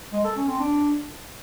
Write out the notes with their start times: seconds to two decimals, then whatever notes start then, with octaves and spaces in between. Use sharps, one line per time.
0.13 G#3
0.24 A4
0.36 C#4
0.48 C4
0.59 D4